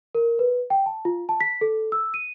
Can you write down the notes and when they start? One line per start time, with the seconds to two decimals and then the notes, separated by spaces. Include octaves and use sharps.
0.15 A#4
0.39 B4
0.70 G5
0.86 A5
1.05 F4
1.29 A5
1.41 B6
1.61 A4
1.92 E6
2.14 D#7